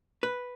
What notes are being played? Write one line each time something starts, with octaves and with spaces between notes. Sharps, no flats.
B4